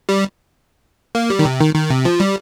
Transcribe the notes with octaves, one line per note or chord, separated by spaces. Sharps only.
G3
A#3
G3
D#3
C3
D#3
D#3
C3
F3
G3